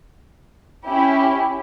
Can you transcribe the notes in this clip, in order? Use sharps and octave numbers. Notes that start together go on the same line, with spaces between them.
C#4 E4 G4